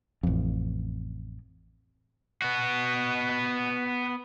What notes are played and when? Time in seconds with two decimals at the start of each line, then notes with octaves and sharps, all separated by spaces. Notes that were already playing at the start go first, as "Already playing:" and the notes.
0.23 A1 F2
2.42 B3 F#4